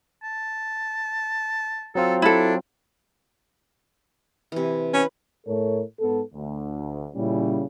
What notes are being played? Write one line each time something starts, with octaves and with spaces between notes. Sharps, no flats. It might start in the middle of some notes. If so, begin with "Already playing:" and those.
A5
F#3 C4 F4 A4
D4 E4 A4
C3 E3
C#4 B4
A2 A3 A4 A#4 C#5
G#2 B3 A4
D2
A#2 C#3 G3 C#4 E4